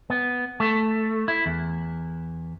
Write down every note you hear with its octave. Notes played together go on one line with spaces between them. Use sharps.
B3
A3
E4
E2